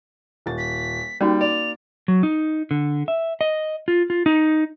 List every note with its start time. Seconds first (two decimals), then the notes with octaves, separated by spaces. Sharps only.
0.46 D#1 A6
0.58 B6
1.21 G3 A#3 C#4 D#4 F#4
1.41 D5 F7
2.08 F#3
2.23 D#4
2.71 D3
3.08 E5
3.41 D#5
3.88 F4
4.10 F4
4.26 D#4